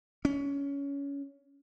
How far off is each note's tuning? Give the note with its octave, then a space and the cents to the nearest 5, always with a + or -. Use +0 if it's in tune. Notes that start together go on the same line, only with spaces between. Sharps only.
C#4 +20